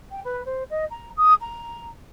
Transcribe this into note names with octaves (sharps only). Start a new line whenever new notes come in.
G5
B4
C5
D#5
A#5
D#6
A#5